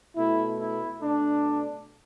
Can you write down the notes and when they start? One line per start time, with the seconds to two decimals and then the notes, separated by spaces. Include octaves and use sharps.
0.16 B2 A3 E4
0.58 E4
1.00 B2 A3 D4